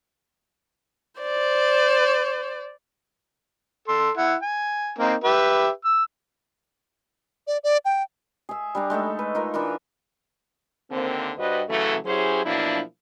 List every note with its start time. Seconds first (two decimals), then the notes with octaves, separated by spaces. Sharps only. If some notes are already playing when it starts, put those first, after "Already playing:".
1.21 C5 D5
3.88 A4 C6
4.17 E4 F#5
4.42 G#5
4.99 A#3 C4 D#4
5.24 G4 B4 E5
5.84 E6
7.47 D5
7.64 D5
7.85 G5
8.49 G#4 E5
8.75 G3 D4 A#5
8.90 G#3 A3 D#4 E5
9.19 B4
9.35 D#4 F4 A#4
9.54 E3 D4 F4 A#4
10.91 D#2 D3 A#3 C4
11.38 G2 G3 F#4 B4 C5 D#5
11.69 C#3 E3 F#3 A3
12.05 F#3 C#4 E4 G4 G#4 C5
12.45 B2 F3 F#3 A#3 D4 E4